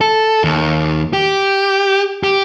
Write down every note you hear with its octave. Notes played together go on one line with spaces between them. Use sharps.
A4
D#2
G4
G4